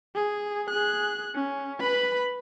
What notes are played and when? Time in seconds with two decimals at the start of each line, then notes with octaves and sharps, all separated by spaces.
0.16 G#4
0.70 G#4 F#6
1.35 C#4
1.80 B4 B5